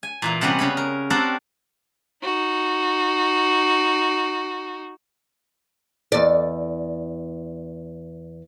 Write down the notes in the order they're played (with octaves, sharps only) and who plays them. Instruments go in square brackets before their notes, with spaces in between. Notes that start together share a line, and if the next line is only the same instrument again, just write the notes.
[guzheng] G#5
A#2 E3 A#3
C3 G3 B3 C#4 F#4 F#5
C#3 C#4 C#5 B5
A#4
C4 D4 F#4 G4 A4 A#4
[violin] D#4 F#4
[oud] E2 D5